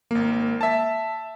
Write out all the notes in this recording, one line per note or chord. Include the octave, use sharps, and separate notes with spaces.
G#1 A#3
E5 A5